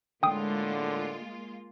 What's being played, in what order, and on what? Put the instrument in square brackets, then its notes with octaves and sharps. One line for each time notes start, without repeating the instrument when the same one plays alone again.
[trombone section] A2 D3 [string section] G#3 A#3 F4 [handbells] G5 D#6